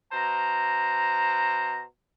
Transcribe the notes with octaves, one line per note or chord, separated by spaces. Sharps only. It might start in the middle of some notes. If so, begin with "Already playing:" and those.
B2 C5 A#5